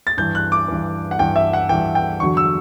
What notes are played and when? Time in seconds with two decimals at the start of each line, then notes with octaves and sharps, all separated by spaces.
0.07 A6
0.17 G2 E3 G6
0.35 F#6
0.52 D6
0.68 G2 E3
1.11 F#5
1.19 G2 E3 G5
1.36 E5
1.53 F#5
1.69 G2 E3 G5
1.95 G5
2.20 E2 D3 F#3 C#6
2.37 E6